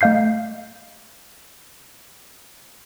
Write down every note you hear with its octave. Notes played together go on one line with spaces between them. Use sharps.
A3 D#5 F5 G6 C7